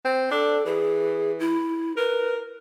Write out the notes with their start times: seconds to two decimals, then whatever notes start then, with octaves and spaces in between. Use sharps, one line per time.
0.04 C4
0.31 D4 A4
0.66 E3 G#4
1.40 E4
1.97 A#4 B4